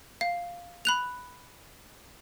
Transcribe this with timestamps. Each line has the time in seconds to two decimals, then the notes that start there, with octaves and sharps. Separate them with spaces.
0.21 F5
0.85 B5 F#6 F7